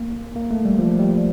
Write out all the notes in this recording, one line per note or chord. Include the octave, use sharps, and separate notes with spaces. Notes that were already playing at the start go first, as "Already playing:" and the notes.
Already playing: A#3
A#3
A3
G3
F3
G3